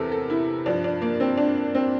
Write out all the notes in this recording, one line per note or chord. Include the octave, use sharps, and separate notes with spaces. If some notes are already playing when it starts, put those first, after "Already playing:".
Already playing: E2 C3 A4 A#4
A4
E4
G2 F3 D4
D4
A#3
C4
D4
C4